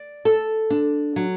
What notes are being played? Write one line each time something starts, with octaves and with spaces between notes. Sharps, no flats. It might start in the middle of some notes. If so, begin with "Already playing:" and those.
Already playing: D5
A4
D4
F#3